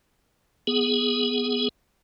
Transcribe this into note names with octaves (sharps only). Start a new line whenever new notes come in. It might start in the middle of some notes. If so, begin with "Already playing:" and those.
B3 G#4